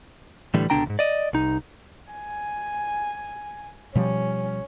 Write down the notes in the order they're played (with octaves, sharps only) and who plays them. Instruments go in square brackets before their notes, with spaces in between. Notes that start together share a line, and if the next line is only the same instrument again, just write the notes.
[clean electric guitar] A2 D3 E3 G3
C#2 B2 D3 D4 G5 A#5
D2 G#2
D5 D#5
C2 D#4
[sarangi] G#5
[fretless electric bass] B2 F3 G3 [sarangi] C#4